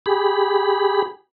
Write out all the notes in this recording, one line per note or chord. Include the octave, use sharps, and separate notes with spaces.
G4 G#4 B5